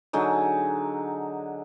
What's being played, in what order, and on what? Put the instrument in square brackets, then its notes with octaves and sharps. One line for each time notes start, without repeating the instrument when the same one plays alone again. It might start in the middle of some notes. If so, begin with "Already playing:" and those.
[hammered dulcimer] D3 F#3 D#4 G#4